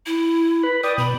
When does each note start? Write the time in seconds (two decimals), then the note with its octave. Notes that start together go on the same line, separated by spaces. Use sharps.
0.06 E4
0.63 B4 B5
0.83 B4 D5 G5 D#6
0.98 B2 B5